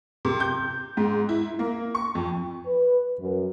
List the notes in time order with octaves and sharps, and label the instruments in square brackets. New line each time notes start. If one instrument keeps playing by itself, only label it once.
[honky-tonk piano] C3
G6
G#2
E4
A#3
C#6
F2
[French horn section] B4
F#2